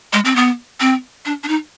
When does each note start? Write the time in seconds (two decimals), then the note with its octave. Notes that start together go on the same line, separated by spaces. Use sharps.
0.13 G#3
0.25 C4
0.36 B3
0.80 C4
1.25 D4
1.44 D4
1.48 D#4